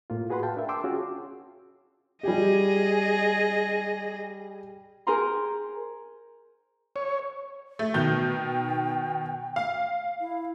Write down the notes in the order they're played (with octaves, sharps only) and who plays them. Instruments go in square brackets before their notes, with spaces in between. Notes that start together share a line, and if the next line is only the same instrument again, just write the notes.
[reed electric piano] A2 A#3 F4
F#4 G#4 B4 F#5 B5 C6
F5 G5 A5
D4 A#4 E5
G5 A5 C6 D6 E6
C#4 F4 F#4 G#4
[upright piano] G3 G4 [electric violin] G#4 D#5
[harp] G#4 A#4 C5 G#5 A#5 C6
[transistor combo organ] C#5
[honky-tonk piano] A3
[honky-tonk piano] B2 D#3 G6 [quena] G5
[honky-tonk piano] F5
[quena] E4